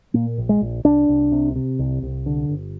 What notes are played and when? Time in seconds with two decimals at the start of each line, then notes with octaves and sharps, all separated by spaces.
0.14 A#2 A#3
0.38 A#1
0.49 G#3
0.61 A#1
0.85 C2 D4
1.09 C2
1.32 C3
1.56 C3
1.79 C2
2.03 C2
2.26 D3
2.49 G1